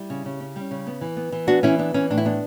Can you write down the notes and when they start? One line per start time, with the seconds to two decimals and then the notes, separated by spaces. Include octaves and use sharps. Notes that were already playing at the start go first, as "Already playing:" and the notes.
Already playing: G3 E4 G4
0.10 C#3
0.25 C#3
0.40 C#4
0.56 G3
0.71 C#3
0.87 B3
1.01 E3
1.17 B3
1.32 E3
1.47 B3 D4 F#4
1.63 E3 C#4 E4
1.79 B3 D4
1.94 E3 C#4
2.10 A2 D4
2.18 E4
2.25 B3 D4